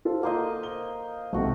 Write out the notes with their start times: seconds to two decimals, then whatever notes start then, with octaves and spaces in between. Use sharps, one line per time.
0.05 F4 A4 C5
0.23 A#3 C5 D#5 F5
0.63 G7
1.33 B1 G#2 C3 A3 F#4